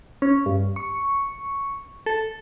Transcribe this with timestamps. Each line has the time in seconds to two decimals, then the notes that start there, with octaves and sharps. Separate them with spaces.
0.22 C#4
0.46 G2
0.76 C#6
2.06 A4